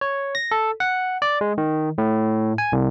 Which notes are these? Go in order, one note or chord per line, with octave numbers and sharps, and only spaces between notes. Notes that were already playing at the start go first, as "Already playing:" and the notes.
C#5
A#6
A4
F#5
D5
G#3
D#3
A2
G#5
C2